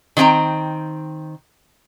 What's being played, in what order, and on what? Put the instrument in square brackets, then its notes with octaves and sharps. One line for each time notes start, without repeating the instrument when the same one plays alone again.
[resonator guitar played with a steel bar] D#3 B3 C4 G5 A#5